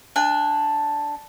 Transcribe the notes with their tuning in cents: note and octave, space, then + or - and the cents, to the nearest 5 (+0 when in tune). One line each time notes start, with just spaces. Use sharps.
D4 +0 G#5 -40